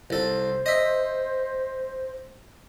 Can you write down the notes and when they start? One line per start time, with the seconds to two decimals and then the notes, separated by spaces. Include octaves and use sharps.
0.10 C2 A4 C5
0.66 D#5 E5